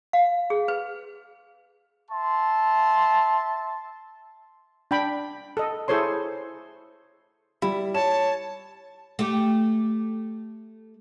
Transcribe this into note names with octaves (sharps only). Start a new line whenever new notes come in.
F5
G#4
B4
E5 A5 C6
D4 G5 B5
A4 D#5
E4 G#4 A4 C5 C#5 C6
G3 E4
C#5 A5 E7
A3 G4